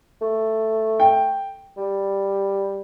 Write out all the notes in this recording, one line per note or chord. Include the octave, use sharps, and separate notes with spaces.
A3
G5
G3